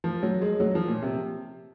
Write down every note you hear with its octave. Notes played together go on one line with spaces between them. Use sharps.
F3
F#3
G#3
F#3
F3
A#2
C3